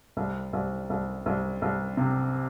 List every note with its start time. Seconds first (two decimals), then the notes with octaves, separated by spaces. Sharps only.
0.17 C2
0.53 C2
0.90 C2
1.26 C2
1.62 C2
1.97 C3